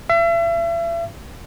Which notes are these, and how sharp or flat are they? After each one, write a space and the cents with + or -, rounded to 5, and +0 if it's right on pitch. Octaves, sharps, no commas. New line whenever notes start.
E5 +40